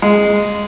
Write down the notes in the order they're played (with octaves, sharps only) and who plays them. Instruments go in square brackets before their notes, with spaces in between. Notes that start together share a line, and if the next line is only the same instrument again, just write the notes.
[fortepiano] G#3